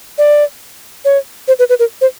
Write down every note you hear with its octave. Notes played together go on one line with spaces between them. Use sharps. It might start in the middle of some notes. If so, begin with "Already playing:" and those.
D5
C#5
C5
B4
B4
A#4
C5